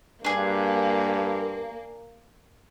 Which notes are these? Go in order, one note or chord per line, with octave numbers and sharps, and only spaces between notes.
G2 A#3 D4 G#4